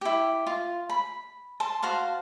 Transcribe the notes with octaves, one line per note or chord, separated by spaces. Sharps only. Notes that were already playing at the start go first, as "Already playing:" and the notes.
E4 G4
F4
B5
A5 C6
F#4 C5 F5 A5